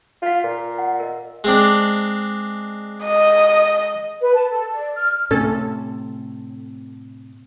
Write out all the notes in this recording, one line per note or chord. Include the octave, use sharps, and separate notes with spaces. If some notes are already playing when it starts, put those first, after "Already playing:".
F4 C#5 F5
A#2
F#5
A#4 D#5
G#3 C4 D4
D#5
B4
A5
A4
D5
F6
A2 C3 C#4 A4